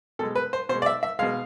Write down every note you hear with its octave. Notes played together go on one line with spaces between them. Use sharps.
B2 G#3 A4
B4
C5
B2 G#3 C5
D5
E5
E5
B2 G#3 F5